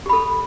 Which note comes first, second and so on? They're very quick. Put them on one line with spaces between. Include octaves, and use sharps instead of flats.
G4 B5 A4